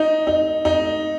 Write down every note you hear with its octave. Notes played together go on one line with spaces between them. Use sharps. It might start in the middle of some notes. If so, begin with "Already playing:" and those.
Already playing: D#4
D#4
D#4